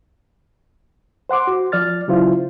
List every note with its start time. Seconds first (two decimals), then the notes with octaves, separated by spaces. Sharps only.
1.29 C5 F#5 C6 D6
1.47 F#4
1.72 F3 D5 F6 A6
2.08 C#3 F#3 E4 F4 C5